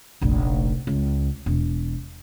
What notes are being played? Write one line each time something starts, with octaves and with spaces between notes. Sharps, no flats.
F1 A#1
C#2
E1